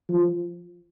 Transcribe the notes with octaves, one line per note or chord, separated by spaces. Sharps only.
F3